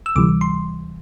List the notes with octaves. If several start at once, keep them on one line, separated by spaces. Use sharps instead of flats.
E6
D2 C3 E3 G3 D6
C6